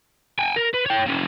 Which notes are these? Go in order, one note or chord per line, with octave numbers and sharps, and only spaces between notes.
G5 G#5
A#4
B4
C#5 G5
A#3 C#4